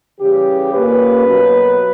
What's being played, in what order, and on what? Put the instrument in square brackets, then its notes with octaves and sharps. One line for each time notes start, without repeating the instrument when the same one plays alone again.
[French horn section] C#3 E3 G3 G4
A#2 A#3 C#4 B4
B2 F#3 A#3